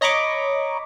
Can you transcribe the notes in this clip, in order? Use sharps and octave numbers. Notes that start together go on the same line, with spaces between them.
C#5 D#5 A#5 B5 C#6 D6